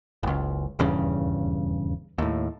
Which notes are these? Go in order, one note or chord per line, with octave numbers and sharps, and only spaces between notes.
F#1 C#2
D#1 E2 G2 C#3
D#2 A2